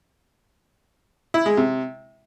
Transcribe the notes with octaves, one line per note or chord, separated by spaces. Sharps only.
E4
G#3
C3